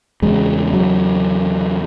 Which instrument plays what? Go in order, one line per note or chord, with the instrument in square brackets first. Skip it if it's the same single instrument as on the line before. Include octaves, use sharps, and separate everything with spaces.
[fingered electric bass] E2 C#3 G#3
F#3